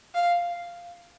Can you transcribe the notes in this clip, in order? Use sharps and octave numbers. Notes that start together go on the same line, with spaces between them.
F5